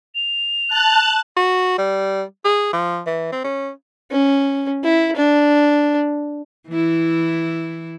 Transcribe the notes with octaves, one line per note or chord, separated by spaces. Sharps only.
F7
A5 F#6
F#4
G3
G#4
F3
E3
C4
C#4
C#4
E4
D4
E3 E4